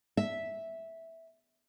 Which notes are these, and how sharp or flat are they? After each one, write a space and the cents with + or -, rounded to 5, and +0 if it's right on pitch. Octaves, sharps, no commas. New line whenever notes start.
E5 -5